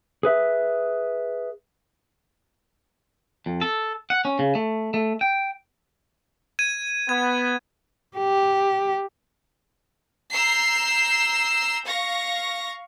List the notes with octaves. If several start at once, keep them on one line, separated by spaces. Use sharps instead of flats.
G#4 B4 E5
F2
A4
F#5
C#4
C#3
A3
A3
G5
G#6 D#7
B3 G#6
G4
A#5 E6 G6 C7
F5 C#6 A#6